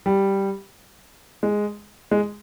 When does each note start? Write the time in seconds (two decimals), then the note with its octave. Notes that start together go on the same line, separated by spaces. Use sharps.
0.06 G3
1.43 G#3
2.11 G#3